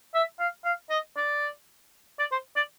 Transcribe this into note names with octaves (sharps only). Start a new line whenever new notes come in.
E5
F5
F5
D#5
D5
D5
C5
D5